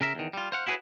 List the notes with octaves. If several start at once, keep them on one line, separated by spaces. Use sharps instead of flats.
C#3 A#4 E5
E2 D#3
G3 F4
C5 F5 F#5
E4 F#4 G#4 A4 B4 C#5